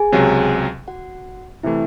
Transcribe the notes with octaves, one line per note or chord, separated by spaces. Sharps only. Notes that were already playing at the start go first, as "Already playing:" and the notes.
Already playing: G#4 G#5
C#2 C3 F#3
F#4 F#5
C3 E3 A3 E4 E5